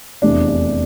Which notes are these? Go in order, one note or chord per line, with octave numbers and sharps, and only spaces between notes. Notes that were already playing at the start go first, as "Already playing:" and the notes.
F1 E2 C3 E3 D4
D4